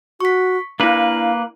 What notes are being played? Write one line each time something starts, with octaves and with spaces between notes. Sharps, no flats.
F#4 C#6 B6
A#3 D4 E4 B4 F5